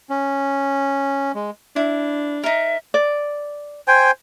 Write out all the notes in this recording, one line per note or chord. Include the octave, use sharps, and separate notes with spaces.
C#4
G#3
D4 E4
D#4 A#4 E5
D5
C5 G5 G#5